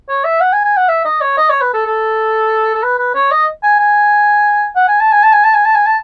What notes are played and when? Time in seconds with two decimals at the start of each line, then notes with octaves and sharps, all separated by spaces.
0.09 C#5
0.24 E5
0.41 F#5
0.53 G#5
0.65 G#5
0.77 F#5
0.89 E5
1.05 D#5
1.21 C#5
1.37 D#5
1.50 C#5
1.61 B4
1.74 A4
1.86 A4
2.75 A4
2.83 B4
2.99 B4
3.15 C#5
3.31 D#5
3.63 G#5
3.80 G#5
4.76 F#5
4.88 G#5
5.00 A5
5.12 G#5
5.23 A5
5.33 G#5
5.44 A5
5.54 G#5
5.65 A5
5.75 G#5
5.86 A5